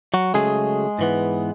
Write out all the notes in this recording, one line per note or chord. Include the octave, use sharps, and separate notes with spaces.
F#3 F#4
C#3 F#3 G#3 A3 G#4
G#2 E3 B3